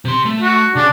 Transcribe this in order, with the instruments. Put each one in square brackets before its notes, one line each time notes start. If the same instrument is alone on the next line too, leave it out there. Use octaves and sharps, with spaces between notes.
[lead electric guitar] C3 C6
A3
[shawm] F#4
[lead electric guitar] C#3 [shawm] D4